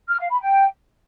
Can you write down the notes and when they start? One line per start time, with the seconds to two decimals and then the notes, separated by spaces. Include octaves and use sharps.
0.09 F6
0.19 F5
0.30 B5
0.40 G5